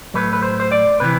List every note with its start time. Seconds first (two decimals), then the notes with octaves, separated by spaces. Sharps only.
0.14 A2 F#3 A3 B4
0.33 B4
0.42 C5
0.60 C5
0.72 D5
1.00 C3 E3 B4